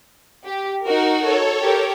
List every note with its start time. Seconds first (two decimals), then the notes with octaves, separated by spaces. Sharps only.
0.45 G4
0.84 D#4 F#4 A#4
1.19 A4 C#5
1.61 G4 A#4 G5